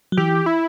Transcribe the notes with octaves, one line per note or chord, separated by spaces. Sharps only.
F#3
E3 G4
E4